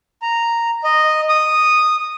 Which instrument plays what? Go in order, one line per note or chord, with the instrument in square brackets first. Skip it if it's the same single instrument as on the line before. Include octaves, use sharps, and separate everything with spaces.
[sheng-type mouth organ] A#5
D#5
D#6